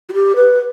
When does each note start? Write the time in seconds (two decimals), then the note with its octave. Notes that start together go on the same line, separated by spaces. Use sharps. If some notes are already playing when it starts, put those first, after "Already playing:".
0.09 F#4
0.13 G4
0.36 B4